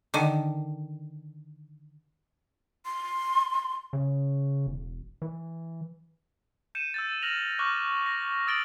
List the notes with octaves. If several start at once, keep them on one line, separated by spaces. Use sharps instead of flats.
D3 D#3
C6
C#3
E1
E3
G6 C#7 D#7 E7
E6 G6 A6
F6 A#6 D#7 F7 F#7
C#6 D6 F6 F#6 A6
A#6
D#6 E6 A6 D7 F#7 G7